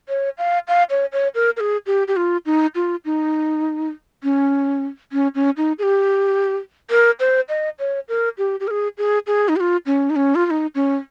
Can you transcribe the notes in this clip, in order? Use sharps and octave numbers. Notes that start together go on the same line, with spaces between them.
C#5
F5
F5
C#5
C#5
A#4
A#4
G#4
G4
G4
F4
D#4
F4
D#4
C#4
C#4
C#4
D#4
G#4
G4
A#4
C5
D#5
C#5
A#4
G4
G4
A#4
G#4
G#4
G#4
D#4
G4
F4
C#4
D#4
C#4
F4
F4
D#4
C#4